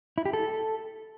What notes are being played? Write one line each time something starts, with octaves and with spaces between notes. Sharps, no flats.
E4
G4
A4